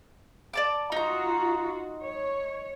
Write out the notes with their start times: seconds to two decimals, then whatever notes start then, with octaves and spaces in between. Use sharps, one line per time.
0.53 D5 A5 D6
0.92 D#4 F4 F#4 A#5
2.04 C#5